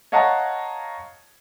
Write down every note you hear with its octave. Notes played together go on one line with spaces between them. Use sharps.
C#5 D#5 F5 F#5 A5 A#5